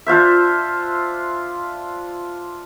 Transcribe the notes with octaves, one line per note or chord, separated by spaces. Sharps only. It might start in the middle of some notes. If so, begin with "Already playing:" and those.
D4 F4 C5 E5